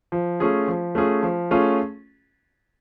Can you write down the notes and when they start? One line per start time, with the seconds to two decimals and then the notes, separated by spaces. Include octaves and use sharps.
0.12 F3
0.40 A3 C#4 F4 G#4
0.68 F3
0.95 A3 C#4 F4 G#4
1.23 F3
1.51 A3 C#4 F4 G#4